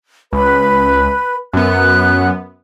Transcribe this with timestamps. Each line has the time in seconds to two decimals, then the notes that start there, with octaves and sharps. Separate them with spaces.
0.33 C#2 B4 B5
1.53 F#2 B3 F#6